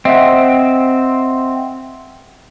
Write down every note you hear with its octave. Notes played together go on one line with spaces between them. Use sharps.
C4 D#5 E5 F#5